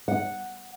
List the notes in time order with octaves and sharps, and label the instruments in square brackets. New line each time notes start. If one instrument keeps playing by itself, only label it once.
[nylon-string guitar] F#5